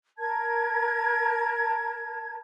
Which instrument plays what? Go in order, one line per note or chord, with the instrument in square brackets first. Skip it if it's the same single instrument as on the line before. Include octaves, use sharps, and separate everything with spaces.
[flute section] A#4 A5 G#6